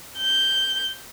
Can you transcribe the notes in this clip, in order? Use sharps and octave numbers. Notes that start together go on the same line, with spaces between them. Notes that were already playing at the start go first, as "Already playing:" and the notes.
G6